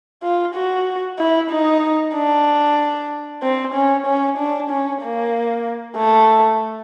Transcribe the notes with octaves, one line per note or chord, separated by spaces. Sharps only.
F4
F#4
E4
D#4
D4
C4
C#4
C#4
D4
C#4
A#3
A3